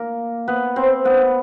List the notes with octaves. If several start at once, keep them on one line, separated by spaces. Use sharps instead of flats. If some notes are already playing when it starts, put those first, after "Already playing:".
Already playing: A#3 A#4
B3 B4
C4 C5
B3 B4